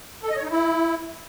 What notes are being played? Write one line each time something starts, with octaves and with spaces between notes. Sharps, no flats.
A4
D#5
C#5
D#4
E4